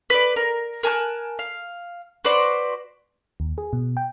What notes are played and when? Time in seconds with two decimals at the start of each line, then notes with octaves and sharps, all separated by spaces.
0.10 B4 D5
0.36 A#4
0.83 A#4 G#5 A5 F#6
1.39 F5
2.24 F#4 B4 C5 D5
3.40 D#2
3.58 G#4
3.73 B2
3.97 G5